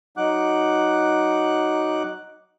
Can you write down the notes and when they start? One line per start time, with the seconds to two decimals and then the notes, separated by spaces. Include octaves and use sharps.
0.17 F#3 D#4 F#5 D6 F#6